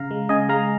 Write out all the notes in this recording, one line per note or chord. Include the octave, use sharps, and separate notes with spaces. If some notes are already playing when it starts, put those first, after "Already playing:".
Already playing: C#3 F5 A#5
G#3
C#3 D#5 G#5
G#3 F5 A#5